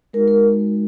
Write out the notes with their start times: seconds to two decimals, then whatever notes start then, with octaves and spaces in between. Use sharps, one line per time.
0.13 G#3 D#4 F#4 A#4
0.28 A#4